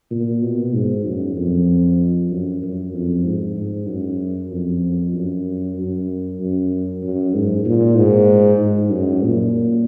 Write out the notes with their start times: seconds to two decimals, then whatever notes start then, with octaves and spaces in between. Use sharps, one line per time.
0.11 A#2
0.42 B2
0.74 G#2
1.05 F#2
1.36 F2
2.31 F#2
2.62 F#2
2.93 F2
3.25 G#2
3.56 G#2
3.88 F#2
4.51 F2
5.14 F#2
5.77 F#2
6.40 F#2
7.03 F#2
7.34 G#2
7.65 A#2
7.97 G#2
8.59 G#2
8.91 F#2
9.23 A#2